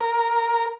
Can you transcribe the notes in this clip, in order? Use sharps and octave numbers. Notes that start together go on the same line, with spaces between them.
A#4